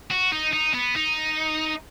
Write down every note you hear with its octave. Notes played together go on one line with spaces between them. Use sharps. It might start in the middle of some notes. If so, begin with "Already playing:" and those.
F#4
D#4
D#4
B3
D#4